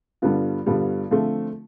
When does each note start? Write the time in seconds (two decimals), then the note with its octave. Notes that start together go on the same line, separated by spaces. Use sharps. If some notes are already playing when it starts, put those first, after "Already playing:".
0.22 G2 D3 G3 B3 F4
0.66 G2 D3 G3 B3 F4
1.11 D3 F3 A3 C4 F4